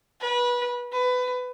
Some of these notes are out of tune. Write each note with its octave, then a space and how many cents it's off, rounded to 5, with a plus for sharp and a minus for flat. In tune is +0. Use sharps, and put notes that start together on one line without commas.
B4 -25
B4 +20